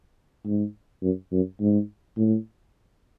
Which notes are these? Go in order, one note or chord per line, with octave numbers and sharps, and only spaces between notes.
G#2
F#2
F#2
G#2
A2